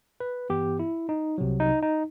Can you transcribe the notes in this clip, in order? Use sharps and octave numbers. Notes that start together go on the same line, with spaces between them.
B4
G2 E3 B3 G4
E4
D#4
C2 C3 F#3
D#4
D#4